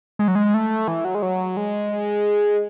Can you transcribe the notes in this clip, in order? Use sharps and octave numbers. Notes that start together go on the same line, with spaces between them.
G#3
F#3
G#3
A3
E3
F#3
G#3
F#3
G#3